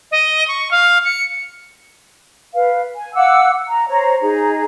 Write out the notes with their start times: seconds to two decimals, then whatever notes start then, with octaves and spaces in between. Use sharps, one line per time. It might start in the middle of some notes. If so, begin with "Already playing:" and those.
0.11 D#5
0.48 C#6
0.71 F5
1.04 C#7
2.54 B4 F5
2.96 G#5
3.14 F5 F#5 D6 E6
3.68 A#5
3.88 C5 C#5 A#5
4.21 D#4 G#4 A#5